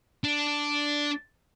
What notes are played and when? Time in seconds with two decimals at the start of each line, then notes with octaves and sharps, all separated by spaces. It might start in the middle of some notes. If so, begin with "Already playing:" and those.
0.24 D4